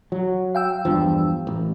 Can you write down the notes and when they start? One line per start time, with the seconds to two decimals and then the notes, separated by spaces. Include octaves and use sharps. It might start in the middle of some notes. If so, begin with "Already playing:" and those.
0.12 F#3
0.55 F5 G5 E6
0.85 E2 G2 F3
1.47 A1